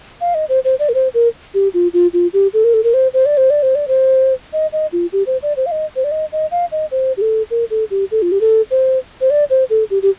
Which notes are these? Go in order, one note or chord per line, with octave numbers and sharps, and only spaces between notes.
F5
D#5
C5
C5
D5
A#4
C5
A#4
G4
F4
F4
F4
G4
A4
A#4
A4
A#4
C5
C5
D5
C5
D5
C5
D5
C5
D#5
D#5
F4
G4
C5
D5
C5
F5
D#5
C5
D5
D#5
D#5
F5
D#5
C5
G4
A4
A#4
A4
G4
A4
F4
G4
A4
C5
C5
D5
C5
A4
G4
G4